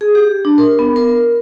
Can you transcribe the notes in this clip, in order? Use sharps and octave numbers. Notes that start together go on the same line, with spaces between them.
G#4
G4
D4
A#4
B3
A#4